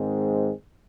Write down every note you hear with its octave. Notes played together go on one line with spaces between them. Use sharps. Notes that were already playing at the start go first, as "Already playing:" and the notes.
Already playing: G#2 D#3 G#3 C4